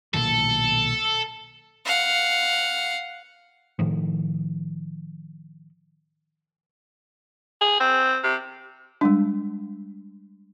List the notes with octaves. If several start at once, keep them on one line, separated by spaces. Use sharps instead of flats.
B1 A#2 D#3 A4
F5 F#5
A2 D#3 F3
G#4
C4
C3
G3 G#3 D4